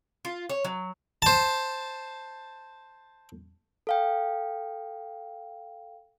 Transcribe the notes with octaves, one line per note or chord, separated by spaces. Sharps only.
F4
C#5
F#3
C5 A5
A4 F5 G5